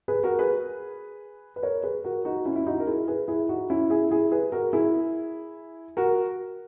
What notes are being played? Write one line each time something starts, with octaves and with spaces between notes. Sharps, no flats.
G#4 B4
F#4 A#4
G#4 B4
B4
A#4 C#5
G#4 B4
F#4 A#4
D#4 F#4
C#4 E4
E4
D#4 F#4
A#4
E4 G#4
G#4 B4
E4 G#4
D#4 F#4
C#4 E4
E4 G#4
E4 G#4
G#4 B4
F#4 A#4
E4 G#4
F#4 A#4